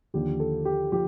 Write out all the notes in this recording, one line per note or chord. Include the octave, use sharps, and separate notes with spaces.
D#2 D3 F3 G4
A4
G4
F3 G4